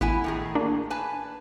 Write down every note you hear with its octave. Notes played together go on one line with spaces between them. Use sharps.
A1 B3 E4 G#5
A2 D#3 G#4
A#3 D4
B4 G#5 A5